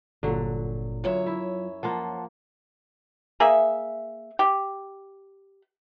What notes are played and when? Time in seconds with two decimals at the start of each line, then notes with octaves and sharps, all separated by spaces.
0.23 G1 A#2 D3 F#3
1.04 F#2 F#3 F4 C#5 E5
1.27 E4
1.83 F3 A#3 F#5 A5 C6
3.40 A#3 G#4 E5
4.39 G4